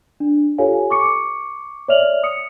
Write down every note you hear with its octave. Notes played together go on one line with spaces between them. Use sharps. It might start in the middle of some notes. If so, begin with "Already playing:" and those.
D4
F4 G4 A4 C#5 F5 G#5
C#6 D6 C#7
C#5 D5 E5 F6 F7 F#7
D#6 C#7